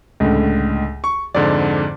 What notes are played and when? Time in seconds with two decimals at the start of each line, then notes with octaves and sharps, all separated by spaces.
0.20 C#2 A2 D3
1.04 C#6
1.35 F2 G#2 D3 D5